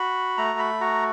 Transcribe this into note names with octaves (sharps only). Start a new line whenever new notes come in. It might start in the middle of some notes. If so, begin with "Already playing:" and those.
Already playing: F#4 B5
A3 A#5
B5
F#4 A#5